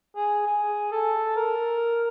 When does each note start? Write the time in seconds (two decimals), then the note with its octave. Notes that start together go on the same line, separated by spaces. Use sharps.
0.16 G#4
0.47 G#4
0.92 A4
1.36 A#4